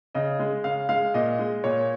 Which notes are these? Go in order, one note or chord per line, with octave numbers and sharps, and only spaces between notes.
C#3 D#5
G#3
C#3 F5
G#3 F5
A#2 D#5
G#3
A#2 C#5